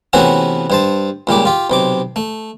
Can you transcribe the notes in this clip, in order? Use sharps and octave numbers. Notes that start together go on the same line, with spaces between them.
C3 E3 A3 B3 C#4 F#4
G2 C5 A5
C#2 A#2 G3 D6
F4 G4
B1 C3 D6
A3